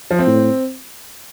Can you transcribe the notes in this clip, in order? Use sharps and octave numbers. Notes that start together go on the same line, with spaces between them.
F3
C4
A2